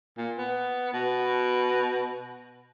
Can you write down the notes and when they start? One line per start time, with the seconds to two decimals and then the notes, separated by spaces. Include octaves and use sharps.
0.18 A#2
0.38 B3
0.93 B2